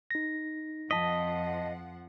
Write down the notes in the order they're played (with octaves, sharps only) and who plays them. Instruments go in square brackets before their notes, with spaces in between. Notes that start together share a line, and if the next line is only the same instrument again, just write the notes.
[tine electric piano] D#4 A#6
[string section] F2 F3 F#5 [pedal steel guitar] D#5 [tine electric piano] A5 B6